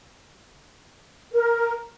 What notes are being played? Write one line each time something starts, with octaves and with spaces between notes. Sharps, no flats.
A#4